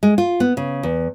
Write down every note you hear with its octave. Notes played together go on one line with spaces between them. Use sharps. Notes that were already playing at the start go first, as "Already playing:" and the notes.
G#3
F4
B3
C#3
E2